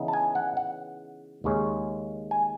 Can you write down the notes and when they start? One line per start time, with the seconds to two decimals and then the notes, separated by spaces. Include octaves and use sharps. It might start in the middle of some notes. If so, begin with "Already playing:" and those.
Already playing: C#3 E3 B3 D#4
0.08 A5
0.13 G#5
0.35 F#5
0.57 F#5
1.44 D#2 C#3 G#3 C#4
2.31 G#5